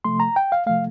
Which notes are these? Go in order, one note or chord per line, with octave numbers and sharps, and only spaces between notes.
C3 F3 A3 C6
A#5
G5
F5
C3 F3 A3 F5